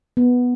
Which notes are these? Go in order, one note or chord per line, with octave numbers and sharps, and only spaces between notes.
B3